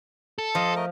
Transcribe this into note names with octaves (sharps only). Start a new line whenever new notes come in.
A4
F3 D#5 C6
A3 A#4 D#5